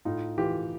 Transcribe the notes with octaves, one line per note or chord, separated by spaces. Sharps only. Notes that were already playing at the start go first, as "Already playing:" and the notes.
A2 D#4 F4
E3 F4 G4